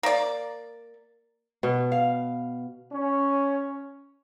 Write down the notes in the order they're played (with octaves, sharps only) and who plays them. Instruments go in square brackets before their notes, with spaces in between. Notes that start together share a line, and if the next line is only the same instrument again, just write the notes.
[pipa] A#3 D5
[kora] B2
F5
[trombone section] C#4